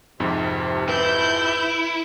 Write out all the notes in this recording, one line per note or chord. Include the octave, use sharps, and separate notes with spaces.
G#1 F2 G#2 C3
E4 B4 G6